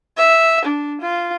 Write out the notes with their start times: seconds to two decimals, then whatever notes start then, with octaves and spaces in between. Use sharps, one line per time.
0.18 E5
0.65 D4
1.01 F4